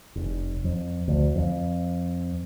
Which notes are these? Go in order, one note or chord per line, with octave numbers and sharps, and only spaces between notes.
F1
F2
D2
F2